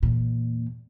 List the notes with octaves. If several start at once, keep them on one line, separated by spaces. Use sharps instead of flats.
E2 A#2